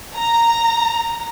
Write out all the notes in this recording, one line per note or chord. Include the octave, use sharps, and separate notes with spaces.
A#5